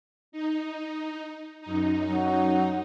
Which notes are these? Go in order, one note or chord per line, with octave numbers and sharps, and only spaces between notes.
D#4
F#2 D#4
F#3